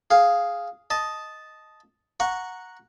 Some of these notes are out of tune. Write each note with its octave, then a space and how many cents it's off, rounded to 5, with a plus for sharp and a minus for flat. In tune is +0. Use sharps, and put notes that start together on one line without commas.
G#4 +0 F5 +0
D#5 +5 A5 -10
F#5 -10 A#5 +0 C#6 +0